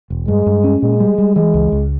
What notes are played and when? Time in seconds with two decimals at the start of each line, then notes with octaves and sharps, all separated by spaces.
0.10 E1
0.28 G2 G#3
0.46 G2
0.64 C#4
0.82 A#2 G#3
1.00 G3
1.18 G3
1.36 E3 G#3
1.54 C#2
1.72 C#2